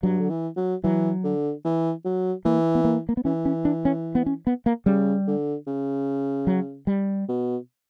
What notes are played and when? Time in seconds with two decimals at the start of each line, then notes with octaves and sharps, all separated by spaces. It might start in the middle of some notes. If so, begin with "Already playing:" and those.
0.03 G2 F#3
0.19 D3
0.29 E3
0.57 F#3
0.83 E3 F#3
1.24 D3
1.64 E3
2.05 F#3
2.45 E3 A#3
2.75 B3
2.85 A#3
3.09 A#3
3.17 B3
3.25 E3 C#4
3.45 C#4
3.65 D4
3.85 C#4
4.15 B3
4.26 C#4
4.47 B3
4.66 A#3
4.86 C#3 G3
5.27 D3
5.67 C#3
6.47 F#3
6.87 G3
7.29 B2